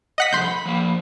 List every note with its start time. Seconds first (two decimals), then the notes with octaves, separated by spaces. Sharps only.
0.18 D#5 F#5 B6
0.33 C2 F2 C6 G6
0.45 B5
0.66 F3 A#3